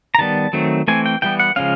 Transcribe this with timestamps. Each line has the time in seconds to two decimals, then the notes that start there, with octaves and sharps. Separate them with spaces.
0.15 A#5
0.18 D#3 G3 B3 A5
0.53 D#3 F#3 A3 C4
0.88 E3 A3 C4 G#5
1.06 G5
1.22 E3 G3 B3 G5
1.40 F#5
1.56 C#3 F3 G#3 C#4 F5